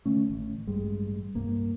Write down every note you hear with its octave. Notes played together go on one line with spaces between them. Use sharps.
D3 A3 C#4
A1
A1 G2 G3 G#3
C2 G2 A#3